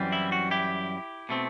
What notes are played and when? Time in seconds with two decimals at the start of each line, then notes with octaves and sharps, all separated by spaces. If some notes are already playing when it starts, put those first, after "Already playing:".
Already playing: F#2 E3 G3 C4
0.12 E4
0.32 F#4
0.51 E4 G4
1.29 B2 A3 C4